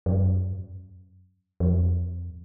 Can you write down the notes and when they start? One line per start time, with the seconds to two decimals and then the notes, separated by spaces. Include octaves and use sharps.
0.06 F#2
1.60 F2